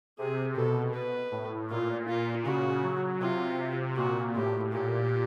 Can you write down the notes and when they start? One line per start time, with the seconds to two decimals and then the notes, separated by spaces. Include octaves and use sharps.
0.19 C3 G#4
0.56 B2 A4
0.94 B4
1.32 A2
1.70 A#2 F4
2.08 F4
2.45 C#3 F#4
2.83 F#3
3.21 C3 F4
3.96 A#2 F#4
4.35 A2 G4
4.73 A#2 G4